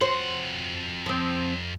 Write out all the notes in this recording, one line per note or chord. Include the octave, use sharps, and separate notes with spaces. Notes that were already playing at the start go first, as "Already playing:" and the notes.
F2 F#4 C5 F#5
F3 C4